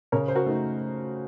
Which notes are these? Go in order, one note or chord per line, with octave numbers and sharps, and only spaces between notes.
C#3 A#4 C#5
C5
F#4 A#4
A3 D#4